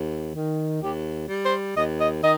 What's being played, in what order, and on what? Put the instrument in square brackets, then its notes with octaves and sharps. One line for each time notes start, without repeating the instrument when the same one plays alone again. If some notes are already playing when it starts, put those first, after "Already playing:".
Already playing: [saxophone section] D#2
D#3
D#2 G4
G3
C5
D#2 D#5
D#5
D#3 D#5